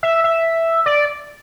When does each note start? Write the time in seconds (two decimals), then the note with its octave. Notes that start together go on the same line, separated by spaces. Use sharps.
0.03 E5
0.24 E5
0.86 D5